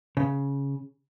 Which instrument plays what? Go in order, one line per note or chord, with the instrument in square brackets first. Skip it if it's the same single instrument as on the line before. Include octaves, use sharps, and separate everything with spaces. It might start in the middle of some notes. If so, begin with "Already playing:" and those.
[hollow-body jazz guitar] C#3